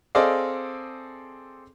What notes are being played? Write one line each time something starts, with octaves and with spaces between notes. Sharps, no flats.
C4 G#4 A4 D5 D#5 F5